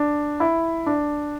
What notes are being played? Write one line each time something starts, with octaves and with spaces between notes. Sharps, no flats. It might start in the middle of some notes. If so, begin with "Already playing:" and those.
Already playing: D4
E4
D4